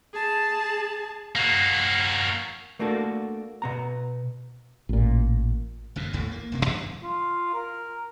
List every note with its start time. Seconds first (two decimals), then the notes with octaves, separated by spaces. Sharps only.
0.13 G#4 A5
1.35 A#3 F#4
2.79 A3 A#3 D4 F#4 A4
3.62 B2 B3 A#5
4.89 A1 A#2
5.96 G1 F2 A#2
6.13 G1 D#2 A2 A3
6.32 A#3
6.52 D#1 C3 A#3
6.65 G2 D#3 F#3 G3
7.03 F4
7.54 A#4